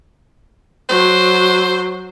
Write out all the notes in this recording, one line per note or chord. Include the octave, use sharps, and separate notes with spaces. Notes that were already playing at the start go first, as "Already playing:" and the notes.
F#3 C5